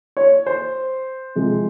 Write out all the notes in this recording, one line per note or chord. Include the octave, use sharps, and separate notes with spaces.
C#5
C5
C3 F3 G#3